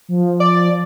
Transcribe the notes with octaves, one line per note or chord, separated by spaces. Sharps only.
F3
D5